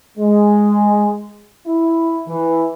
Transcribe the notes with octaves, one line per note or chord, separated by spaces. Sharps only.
G#3
E4
E3